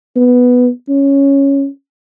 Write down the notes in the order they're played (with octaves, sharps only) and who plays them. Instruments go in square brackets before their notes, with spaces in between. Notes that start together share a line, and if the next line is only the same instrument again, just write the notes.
[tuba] B3
C#4